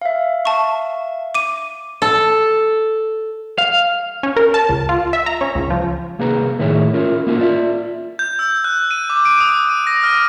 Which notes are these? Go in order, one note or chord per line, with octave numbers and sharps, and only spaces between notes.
E5 F5
A5 C#6
D6 D#7
A4
F5
C#4
A#4
A5
C#2
F4
E5
A#5
C#4
C#2
F3
C2 A#3 G#4 B4 A#5
A2 D#3 E4 G#4 C#5 E5
C#4 E4 F4 A#4
A#3 C#4 E4 F4 G4 A#4
F4 D5 E5
G6
E6
F#6
D#7
D6
D7
D#6
D#7
A#6
F6